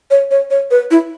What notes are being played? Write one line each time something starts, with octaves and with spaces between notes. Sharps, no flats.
C#5
C#5
C#5
B4
E4